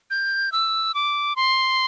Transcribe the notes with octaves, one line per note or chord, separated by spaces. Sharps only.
G6
E6
D6
C6